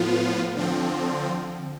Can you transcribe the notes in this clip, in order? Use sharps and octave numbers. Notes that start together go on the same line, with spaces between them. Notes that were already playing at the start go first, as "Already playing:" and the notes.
Already playing: A2 F3 B3 F4
D3 F3 C4